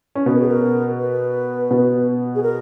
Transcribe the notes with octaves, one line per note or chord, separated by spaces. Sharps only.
C#4
B2 B3 B4
A#4
G#4
A#4
B4
B2 B3
G#4
A#4